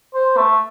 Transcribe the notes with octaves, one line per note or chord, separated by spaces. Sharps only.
C5
A3